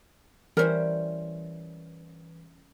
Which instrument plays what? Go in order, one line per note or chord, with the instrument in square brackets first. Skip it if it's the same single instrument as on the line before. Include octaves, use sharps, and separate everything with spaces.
[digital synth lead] E3 [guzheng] G3 C#4 E4 [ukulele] A#4 C5